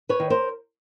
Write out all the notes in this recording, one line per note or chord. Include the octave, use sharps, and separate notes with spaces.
B4 C#5
D#3
A#4 C5